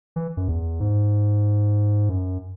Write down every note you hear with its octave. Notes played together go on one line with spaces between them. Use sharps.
E3
F#2
E2
G#2
F#2